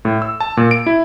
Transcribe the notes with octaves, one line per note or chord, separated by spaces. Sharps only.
A2
E6
A5
A#2
D7
E4